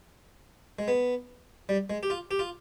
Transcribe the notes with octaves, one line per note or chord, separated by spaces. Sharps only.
G#3
B3
G3
G#3
G4
F4
G4
F4